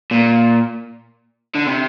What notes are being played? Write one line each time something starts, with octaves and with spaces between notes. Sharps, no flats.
A#2
D3
C3